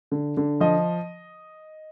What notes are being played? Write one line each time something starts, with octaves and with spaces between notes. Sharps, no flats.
D3
D3
F3 D#5